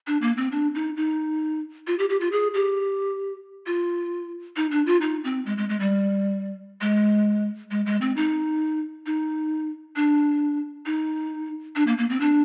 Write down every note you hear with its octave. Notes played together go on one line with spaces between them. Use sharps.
D4
A#3
C4
D4
D#4
D#4
F4
G4
G4
F4
G#4
G4
F4
D#4
D4
F4
D#4
C4
G#3
G#3
G#3
G3
G#3
G#3
G#3
C4
D#4
D#4
D4
D#4
D4
A#3
A#3
C4
D4